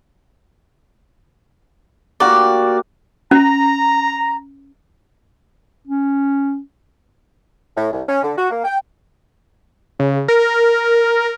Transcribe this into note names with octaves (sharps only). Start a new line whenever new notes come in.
A#3 F#4 G4 D5
C#4 A#5
C#4
A2
C2
C#4
D3
F#4
A#3
G5
C#3
A#4